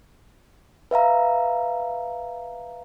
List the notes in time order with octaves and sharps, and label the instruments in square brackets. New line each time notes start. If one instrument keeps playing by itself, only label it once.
[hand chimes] B4 E5 F5 A#5